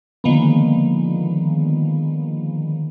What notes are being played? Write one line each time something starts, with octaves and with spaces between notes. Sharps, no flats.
D3 D#3 F3 G#3 A#3 B3